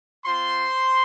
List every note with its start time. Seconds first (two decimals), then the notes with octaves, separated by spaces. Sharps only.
0.25 C4 F4 C5 C6